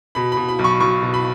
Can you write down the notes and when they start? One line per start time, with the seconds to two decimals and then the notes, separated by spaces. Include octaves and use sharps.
0.15 B2 B5
0.32 B2 B5
0.48 B5
0.59 B1
0.64 C#6
0.80 B1 C#6
1.02 B2
1.14 B5